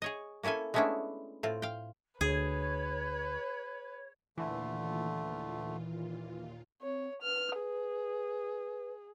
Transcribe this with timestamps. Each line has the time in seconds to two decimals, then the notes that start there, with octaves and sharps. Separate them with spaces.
0.02 G#4 C#5 D#5
0.43 A#3 C#4 E4 A4 G#5
0.74 G#3 A3 B3 C#4 D4 E4
1.43 A2 C4 F4
1.62 F5 G5
2.21 D2 G#4 B4 C#5
4.38 D#2 A#2 D3 E3 A3 F4
6.82 C4 C#5
7.22 B4 F6
7.58 G#4